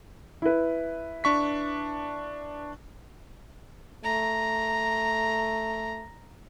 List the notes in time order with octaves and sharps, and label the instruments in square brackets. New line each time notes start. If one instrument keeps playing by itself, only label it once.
[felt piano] E4 B4
[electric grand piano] D4 C#6 B6
[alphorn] A3 [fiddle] A#5